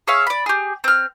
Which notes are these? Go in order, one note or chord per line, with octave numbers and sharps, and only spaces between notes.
G#4 C#5 E5 F5
D5 B5
G4 G#4
C4 F6